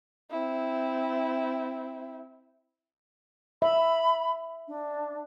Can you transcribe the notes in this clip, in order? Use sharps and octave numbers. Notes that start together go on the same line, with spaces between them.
C4 E4
E5 B5
D4